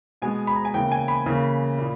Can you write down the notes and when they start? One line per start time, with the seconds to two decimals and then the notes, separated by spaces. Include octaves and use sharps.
0.22 B2 G#3 B3 G#5
0.47 B5
0.56 A#5
0.65 G#5
0.74 C#3 E3 A#3 G5
0.92 G#5
1.08 B5
1.26 C#3 E3 A#3
1.78 A#2